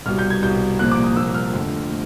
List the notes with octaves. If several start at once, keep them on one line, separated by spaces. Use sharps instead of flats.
C2 B2 G3 F6
G6
G#6
C2 B2 G3 G6
C2 A#2 F3 A#3 F#6
D6
D#6
C2 A#2 F3 A#3 E6
F6
F2 D3 F3 A3
A3